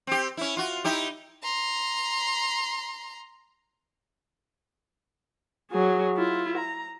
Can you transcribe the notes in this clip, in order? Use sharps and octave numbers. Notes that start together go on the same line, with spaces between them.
C4 G4
C#4 E4
F4 F#4
D#4 E4 G4
A#5 C6
F#3 G#4
E4 F4
A#5